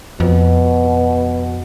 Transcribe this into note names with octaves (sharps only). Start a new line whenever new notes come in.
F2 B2